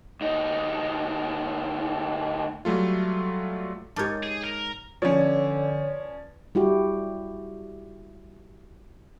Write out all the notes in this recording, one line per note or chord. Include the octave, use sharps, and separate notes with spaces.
D2 D#4
F#3 G3 A3 F4
G#2 G4 A#4 C#5 A5 D6 G6 A6
G#4
A#4
D3 F3 C#4 B4 C#5 D5
G3 E4 F#4 G4